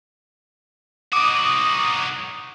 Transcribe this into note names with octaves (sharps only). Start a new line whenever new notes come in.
D#4 F#4 D6 D#6 D#7